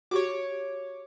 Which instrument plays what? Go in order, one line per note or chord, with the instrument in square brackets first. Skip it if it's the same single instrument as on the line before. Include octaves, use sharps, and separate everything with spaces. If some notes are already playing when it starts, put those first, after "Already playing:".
[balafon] F#4 G4 [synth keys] C#5 D6